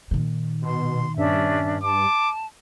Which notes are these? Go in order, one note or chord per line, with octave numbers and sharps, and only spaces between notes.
A#2 D#3
B2 C6
G2 C#4 D4 E5
A5 D6